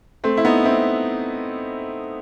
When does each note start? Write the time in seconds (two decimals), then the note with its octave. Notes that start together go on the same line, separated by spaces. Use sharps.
0.24 A3 C4
0.37 E4
0.45 B3 D#4
0.65 C4 E4